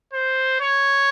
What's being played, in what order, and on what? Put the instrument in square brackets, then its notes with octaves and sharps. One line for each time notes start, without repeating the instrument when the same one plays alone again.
[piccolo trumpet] C5
C#5